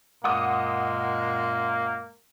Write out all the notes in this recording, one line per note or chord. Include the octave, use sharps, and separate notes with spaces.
F#2 A#2 G#3 A#3 F#5 D6 D#6